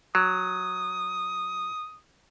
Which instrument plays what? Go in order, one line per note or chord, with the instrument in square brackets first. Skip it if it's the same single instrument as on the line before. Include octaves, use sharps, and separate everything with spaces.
[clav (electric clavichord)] F#3 [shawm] D#6